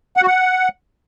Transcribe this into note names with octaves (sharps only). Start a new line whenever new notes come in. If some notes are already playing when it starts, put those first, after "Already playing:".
F#5
F#4
F#5